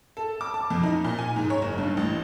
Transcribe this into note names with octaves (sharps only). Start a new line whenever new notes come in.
A4
D6
A5
F2
D#4
A#2
G#5
G#2
C#5
F#1
G2
A1